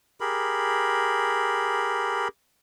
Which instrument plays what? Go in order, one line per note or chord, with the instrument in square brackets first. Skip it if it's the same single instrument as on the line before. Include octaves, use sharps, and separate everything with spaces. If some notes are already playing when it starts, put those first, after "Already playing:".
[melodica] G4 G#4 A#4 B5